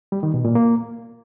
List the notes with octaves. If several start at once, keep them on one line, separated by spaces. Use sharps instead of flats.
G3
D#3
B2
A#2
A#3